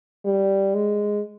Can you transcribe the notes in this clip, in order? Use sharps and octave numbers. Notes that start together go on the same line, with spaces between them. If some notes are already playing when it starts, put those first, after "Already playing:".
G3
G#3